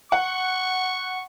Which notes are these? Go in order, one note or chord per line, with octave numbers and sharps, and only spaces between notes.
F#5 C#6